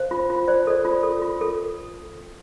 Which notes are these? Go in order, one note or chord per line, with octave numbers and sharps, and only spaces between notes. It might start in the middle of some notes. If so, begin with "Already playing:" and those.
Already playing: C5 F5
F4
F4
C5 D5
A4 D5
F4
A4
F4
A4